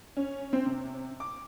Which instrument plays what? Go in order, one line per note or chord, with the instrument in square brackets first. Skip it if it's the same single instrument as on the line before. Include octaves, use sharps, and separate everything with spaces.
[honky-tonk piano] C#4
C4
C3
D6